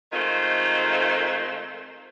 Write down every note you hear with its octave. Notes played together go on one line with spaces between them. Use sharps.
D#3 G#3 A3 C4 F4